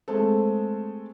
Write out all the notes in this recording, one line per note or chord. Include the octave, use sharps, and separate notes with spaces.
G#3 A3 C4 A4